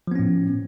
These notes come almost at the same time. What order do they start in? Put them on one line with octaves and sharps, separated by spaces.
F3 B3 C#4 A2